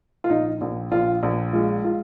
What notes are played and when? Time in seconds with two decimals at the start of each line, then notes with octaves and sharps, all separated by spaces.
0.24 F4
0.30 A#1 D#4
0.61 A#1
0.92 A#1 F4
1.23 A#1
1.53 G#3 F4
1.84 F4